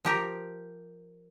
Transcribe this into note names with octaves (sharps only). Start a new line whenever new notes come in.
F3 G4 A#4